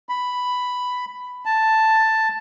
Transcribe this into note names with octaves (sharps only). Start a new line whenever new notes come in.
B5
A5